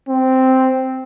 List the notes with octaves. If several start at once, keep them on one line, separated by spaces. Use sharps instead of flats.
C4